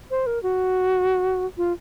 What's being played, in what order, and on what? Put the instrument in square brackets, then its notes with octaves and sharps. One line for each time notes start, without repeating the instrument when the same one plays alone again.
[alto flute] C5
A#4
F#4
F4